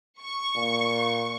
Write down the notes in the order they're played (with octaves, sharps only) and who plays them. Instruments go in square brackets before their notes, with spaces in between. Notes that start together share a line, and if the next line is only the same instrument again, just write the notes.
[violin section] C#6
[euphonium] A#2